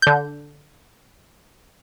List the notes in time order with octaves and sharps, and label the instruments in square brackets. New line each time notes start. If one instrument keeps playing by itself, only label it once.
[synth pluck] D3 G6